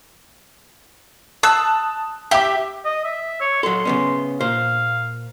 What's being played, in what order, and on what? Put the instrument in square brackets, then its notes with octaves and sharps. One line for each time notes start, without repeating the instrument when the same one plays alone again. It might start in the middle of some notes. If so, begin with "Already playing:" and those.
[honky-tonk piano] A5 D#6 F#6 [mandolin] E6
[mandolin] G4 [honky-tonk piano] E5 D6
[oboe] D#5
E5
C#5
[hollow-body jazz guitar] F#3 A4 [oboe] C6
[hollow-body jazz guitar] C#3 B3 C#4
[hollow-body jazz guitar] A#2 C5 [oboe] F5